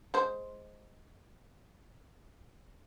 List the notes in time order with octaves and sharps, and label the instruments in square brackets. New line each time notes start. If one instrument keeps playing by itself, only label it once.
[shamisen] G#3 C5